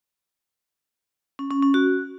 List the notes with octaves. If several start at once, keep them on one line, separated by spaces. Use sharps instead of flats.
C#4
C#4
C#4
F#4